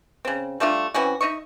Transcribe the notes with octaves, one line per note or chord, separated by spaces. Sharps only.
C#3 C4
G3 A3 D4 F4
E3 C4 C#4 F#4
D#4 D#5 E5 C#6